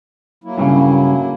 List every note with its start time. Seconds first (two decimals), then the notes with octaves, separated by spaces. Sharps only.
0.44 F#3 A#3 E4
0.58 G2 A#2 C#3